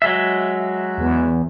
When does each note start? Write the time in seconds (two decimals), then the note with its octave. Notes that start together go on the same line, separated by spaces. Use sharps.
0.02 F#3 G#3 E5
0.98 E2